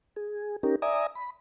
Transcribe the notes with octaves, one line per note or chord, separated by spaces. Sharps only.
G#4
C#4 D#4 G4 A#4
D5 E5 G#5 A#5 D#6
B5